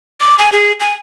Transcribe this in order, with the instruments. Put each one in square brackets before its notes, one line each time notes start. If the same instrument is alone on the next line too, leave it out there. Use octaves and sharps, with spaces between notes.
[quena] D6
G#5
G#4
G#5